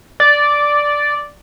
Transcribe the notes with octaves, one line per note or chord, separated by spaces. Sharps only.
D5